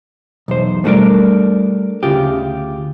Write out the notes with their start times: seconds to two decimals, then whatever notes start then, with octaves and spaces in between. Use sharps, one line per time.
0.48 B1 E2 C5
0.84 G3 A3 D4 F#4 A#4 D5
2.03 D2 C#3 F4 G4